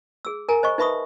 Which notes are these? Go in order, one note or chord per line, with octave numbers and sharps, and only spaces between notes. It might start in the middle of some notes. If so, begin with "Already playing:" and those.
G#4 E6
A#4 G#5 A#5
C5 D#5 C#6
D#4 B4 E5 B5 C#6 D#6